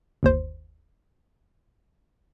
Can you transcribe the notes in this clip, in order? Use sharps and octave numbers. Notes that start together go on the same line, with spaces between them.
G1 D#2 C5